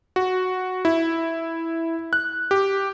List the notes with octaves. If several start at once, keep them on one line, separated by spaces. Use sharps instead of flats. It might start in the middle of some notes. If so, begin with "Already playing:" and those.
F#4
E4
F#6
G4